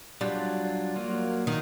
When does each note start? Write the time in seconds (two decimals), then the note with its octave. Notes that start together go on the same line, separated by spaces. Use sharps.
0.21 F#3 G3 D4 F4
0.96 F#3 A#3 F4
1.47 D#3 F5